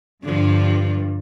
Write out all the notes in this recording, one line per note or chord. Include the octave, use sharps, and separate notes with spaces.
G2 D3 F3